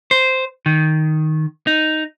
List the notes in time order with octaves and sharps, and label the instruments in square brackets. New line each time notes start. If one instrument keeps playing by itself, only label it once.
[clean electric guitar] C5
D#3
D#4